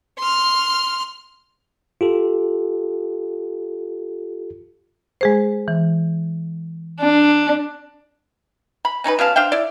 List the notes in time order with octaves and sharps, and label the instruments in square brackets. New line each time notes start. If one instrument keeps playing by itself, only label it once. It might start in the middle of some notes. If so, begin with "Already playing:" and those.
[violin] C6 F6
[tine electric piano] F4 G4 A4
[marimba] G#3 G#4 C5
E3
[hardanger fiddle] D4
[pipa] B5
C#4 D#4 G#4 B4
B2 C#4 F5 A5
D4 C5 F5 G5
E4 D5